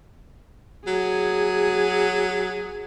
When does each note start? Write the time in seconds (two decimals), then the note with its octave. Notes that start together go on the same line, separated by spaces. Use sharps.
0.87 F#3 G#4